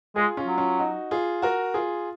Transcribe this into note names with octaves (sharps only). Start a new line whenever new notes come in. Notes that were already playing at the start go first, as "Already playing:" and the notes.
G#3 F4 G#4
C#4 F4
F#3
C#4 F4
D#4 F#4
F4 G#4
F#4 A#4
F4 G#4